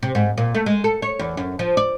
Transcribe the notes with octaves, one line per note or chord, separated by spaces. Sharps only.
C3
G#2
A#2
A3
G#3
A4
C#5
E2
F#2
F3
D5